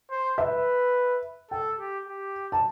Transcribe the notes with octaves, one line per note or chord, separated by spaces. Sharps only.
C5
B4 E5
A4 G5
G4
G4
A5